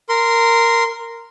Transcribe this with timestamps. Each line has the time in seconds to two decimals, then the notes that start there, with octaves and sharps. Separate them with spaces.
0.09 A#4 C6